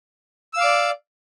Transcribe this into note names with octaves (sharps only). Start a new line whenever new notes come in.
D5 F5 D6 E6